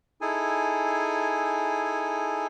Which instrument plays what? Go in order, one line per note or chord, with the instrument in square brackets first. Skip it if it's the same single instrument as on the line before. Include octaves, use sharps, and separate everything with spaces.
[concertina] D#4 E4 G#4 A4 G#5